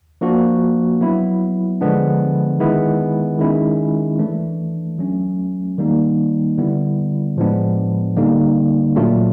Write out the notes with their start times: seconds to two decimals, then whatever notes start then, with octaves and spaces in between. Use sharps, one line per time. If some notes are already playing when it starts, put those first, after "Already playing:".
0.21 F3 A#3 D4 F#4
1.01 F#3 B3 E4
1.81 D3 F3 G#3 B3 D4
2.60 D#3 G#3 B3 E4
3.39 D#3 G#3 C#4 E4
4.19 E3 A3 D4
4.99 F#3 A3 C#4
5.78 D#3 G3 A#3 D#4
6.58 D3 G3 B3 E4
7.37 A2 F3 G#3 B3 D4
8.16 D3 G3 A#3 D#4
8.96 A#2 F#3 A3 D4 F4